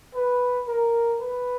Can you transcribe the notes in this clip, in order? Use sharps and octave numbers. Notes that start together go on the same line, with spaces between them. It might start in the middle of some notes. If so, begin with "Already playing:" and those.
B4
A#4
B4